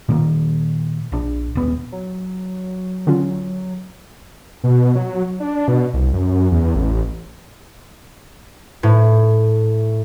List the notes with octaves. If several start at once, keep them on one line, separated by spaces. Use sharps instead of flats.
A#2 D#3 A#3
A#1 D4
D#1 B3
F#3
D3 C#4 F4
B2
F#3
D4
B2
C2
F#2
E2
A1
A2